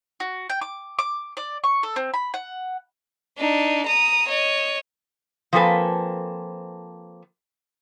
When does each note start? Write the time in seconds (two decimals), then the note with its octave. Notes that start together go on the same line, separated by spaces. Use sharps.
0.20 F#4
0.50 G5
0.61 D6
0.99 D6
1.37 D5
1.64 C#6
1.83 A4
1.96 C4
2.14 B5
2.34 F#5
3.38 D4 D#4
3.86 A#5 D#6
4.28 C#5 D#5
5.53 F3 A#3 C4 A4 B4 G#5